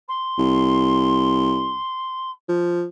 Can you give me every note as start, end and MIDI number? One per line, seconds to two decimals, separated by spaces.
0.08 2.30 84
0.38 1.78 36
2.49 2.85 53